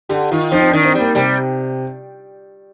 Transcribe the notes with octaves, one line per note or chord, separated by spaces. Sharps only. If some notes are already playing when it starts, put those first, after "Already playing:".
D3 G4
D#3 F4
F3 D#4
C4
D#3 D4
C4
G3
A#3
C3 G3